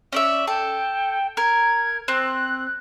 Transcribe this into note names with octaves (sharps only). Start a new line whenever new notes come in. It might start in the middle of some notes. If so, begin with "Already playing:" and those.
C#4 D5 E5
A4 G5
A#4 G#6
C4 F#6